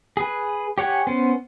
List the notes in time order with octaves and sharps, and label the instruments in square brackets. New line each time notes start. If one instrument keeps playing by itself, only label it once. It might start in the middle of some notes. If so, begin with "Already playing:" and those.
[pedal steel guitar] G#4 B4
G4 C#5 F#5 G#5
B3 C#4 C5